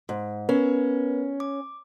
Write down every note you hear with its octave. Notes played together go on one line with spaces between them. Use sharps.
G#2
B3 C#4 A#4 B4
D6